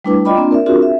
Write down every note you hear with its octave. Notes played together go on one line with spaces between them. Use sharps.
G3 A3 D4 E4 B4 D6
F4 D5 D#5 G5 B5 D6
A#3 C4 D4 F4
A#4 D5 E5
C4 D4 F4 F#4 G#4 A#4
E5